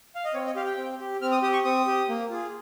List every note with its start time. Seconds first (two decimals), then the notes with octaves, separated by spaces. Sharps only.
0.15 F5
0.25 D#5
0.34 C4 C#5
0.46 D#5
0.55 G4 F5
0.66 G5
0.77 C4
1.00 G4
1.21 C4 F6
1.32 D#6
1.42 G4 D#6
1.53 C#6
1.64 C4 D#6
1.87 G4
2.09 A#3
2.30 F4 G#4